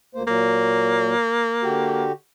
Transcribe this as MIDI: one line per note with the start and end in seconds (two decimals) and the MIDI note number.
0.15 0.23 38
0.15 0.23 58
0.15 0.23 72
0.27 1.14 46
0.27 1.14 54
0.27 2.04 58
1.63 2.12 50
1.63 2.12 66
1.63 2.12 67